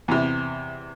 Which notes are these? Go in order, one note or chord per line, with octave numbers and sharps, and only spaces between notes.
E2 C3